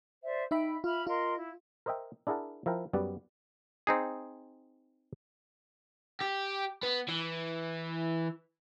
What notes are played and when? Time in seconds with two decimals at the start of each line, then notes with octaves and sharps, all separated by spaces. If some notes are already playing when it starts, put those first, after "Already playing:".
0.23 C5 D5 E5
0.51 D#4 E5 G5 B5
0.84 F4 E5 B5 F6
1.07 F4 A#4 D#5 C6
1.36 E4
1.86 A#4 C5 D#5 E5 G5
2.27 D4 E4 G#4 A#4 F#5 A5
2.66 F3 E4 A#4 G5
2.93 F#2 G3 B3 D5 F#5
3.87 C4 D#4 G#4
6.21 G4
6.83 B3
7.08 E3